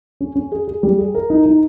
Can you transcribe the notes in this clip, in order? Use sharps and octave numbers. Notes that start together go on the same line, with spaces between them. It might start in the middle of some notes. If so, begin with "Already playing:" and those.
C#4
C#4
G#4
G#4
G3
G#4
A#4
D#4
D#4